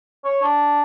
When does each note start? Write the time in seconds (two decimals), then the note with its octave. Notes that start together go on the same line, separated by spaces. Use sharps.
0.24 C#5
0.43 D4